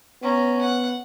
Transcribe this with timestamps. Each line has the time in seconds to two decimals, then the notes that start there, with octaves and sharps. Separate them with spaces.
0.22 B3 C#4 A#5
0.61 F#5